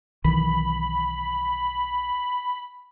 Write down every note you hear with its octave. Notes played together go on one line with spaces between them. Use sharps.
B1 D#3 E3 B5